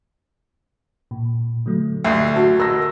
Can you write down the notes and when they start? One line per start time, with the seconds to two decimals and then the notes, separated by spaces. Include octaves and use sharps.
1.11 A#2
1.66 D3 F#3 A3
2.04 D2 E5 C7
2.36 F#4 A5
2.60 A#4 E6 A#6